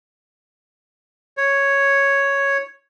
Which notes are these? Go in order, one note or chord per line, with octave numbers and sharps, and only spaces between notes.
C#5